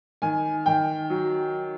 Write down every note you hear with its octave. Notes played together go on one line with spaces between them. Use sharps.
D#3 G#5
D#3 G5
F#3